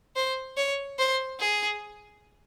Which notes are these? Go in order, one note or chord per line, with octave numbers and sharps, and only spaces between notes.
C5
C#5
C5
G#4